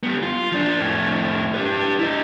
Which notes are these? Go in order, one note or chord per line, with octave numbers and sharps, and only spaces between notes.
G3 B3
F4
F3 D4
F2 A2
G4 B4
E4 D#5